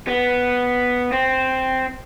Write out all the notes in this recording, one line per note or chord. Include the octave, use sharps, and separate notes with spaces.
B3
C4